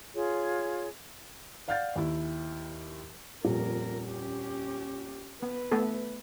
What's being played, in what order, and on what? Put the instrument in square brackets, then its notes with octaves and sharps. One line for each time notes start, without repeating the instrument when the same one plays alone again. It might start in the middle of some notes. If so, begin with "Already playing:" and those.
[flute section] F4 G#4 C#5
[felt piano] D5 F5 F#5 F6 G6 A6
D#2 E4
[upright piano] D#1 F2 A#2 [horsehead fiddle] A#4
[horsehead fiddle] C#4 G4
[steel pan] B3 [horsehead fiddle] B4
[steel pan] A3 B3 A4